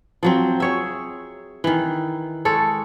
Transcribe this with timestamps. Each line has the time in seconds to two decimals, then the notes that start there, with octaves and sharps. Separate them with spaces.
0.23 F3 F#3 C4
0.60 G#4 C#5 E5
1.64 D#3 E3
2.45 G#3 A4 C#5